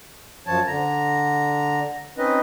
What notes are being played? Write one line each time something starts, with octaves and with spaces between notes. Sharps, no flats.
F#2 F3 C#5 A5
D3 A#5
C4 C#4 D#4 B4 D#5